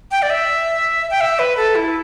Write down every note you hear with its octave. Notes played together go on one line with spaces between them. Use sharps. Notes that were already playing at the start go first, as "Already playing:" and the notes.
G5
D5
E5
G5
E5
B4
A4
E4